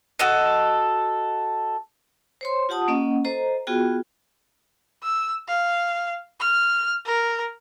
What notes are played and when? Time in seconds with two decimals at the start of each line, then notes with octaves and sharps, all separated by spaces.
0.19 F#4 A4 D#5
2.41 C5 C#5 C6
2.69 F4 G4 F#5 A5 D#6
2.88 A#3 C#4 D#5 F#5
3.25 A4 C5 D#5 A#5
3.67 B3 F4 F#4 G#4 G5
5.03 E6
5.48 F5
6.40 F6
7.06 A#4